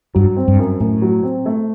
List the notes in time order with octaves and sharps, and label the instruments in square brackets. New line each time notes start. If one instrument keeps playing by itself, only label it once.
[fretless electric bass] G2 [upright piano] F#3
[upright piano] C4
[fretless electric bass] G2
[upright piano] F#2
[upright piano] F#2 [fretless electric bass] A2
[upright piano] F#3
C4
A3